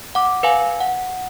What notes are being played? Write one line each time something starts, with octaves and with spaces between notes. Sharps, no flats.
F#5 D6
B4 F5 G#5
F#5